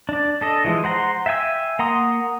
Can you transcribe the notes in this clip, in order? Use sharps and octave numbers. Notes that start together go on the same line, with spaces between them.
D4 D5
D4 A4 D#5
E3 F3 G#3
C5 F#5 A#5 C6
E5 F5 G5 G#5 E6
A#3 F#5 A#5 C6 D#6